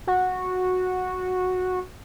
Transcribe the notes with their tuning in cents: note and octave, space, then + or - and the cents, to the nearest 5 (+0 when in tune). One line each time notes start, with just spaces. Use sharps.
F#4 -10